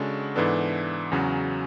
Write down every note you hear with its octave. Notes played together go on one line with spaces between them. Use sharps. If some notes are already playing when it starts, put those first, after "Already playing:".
Already playing: C#3 G#3 D4 F#4 A4
G#2 E3 B3 D4 A4
E2 C#3 F#3 C#4 F#4